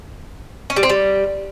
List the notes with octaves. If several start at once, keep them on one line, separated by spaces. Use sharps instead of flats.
C#4
G3
C4
G3